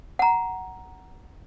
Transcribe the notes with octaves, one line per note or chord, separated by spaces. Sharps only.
F#5 A#5